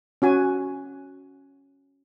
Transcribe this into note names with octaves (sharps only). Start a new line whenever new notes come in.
C#4 F#4 G#5